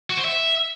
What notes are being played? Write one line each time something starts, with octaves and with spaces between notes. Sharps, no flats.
F#4
C5
E5